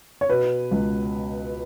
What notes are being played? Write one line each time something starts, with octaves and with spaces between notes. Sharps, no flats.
C#5
B2 B4
C#2